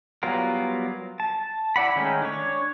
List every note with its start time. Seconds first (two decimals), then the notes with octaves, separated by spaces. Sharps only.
0.23 F#3 G3 B3 F4 A#4
1.20 A5
1.76 E4 D5 F#5 B5
1.96 D#3 G#3 A3 C#4 D#4
2.22 D4 C#5